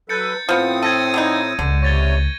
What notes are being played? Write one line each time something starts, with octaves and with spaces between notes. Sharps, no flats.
F#3 A4 B4 G6 A6 C#7
A2 F3 B3 C4 D#6
A4 G#6 A#6 D#7
D3 E3 D#4
C#2 D3
C3 C#5 C#6 A6 G7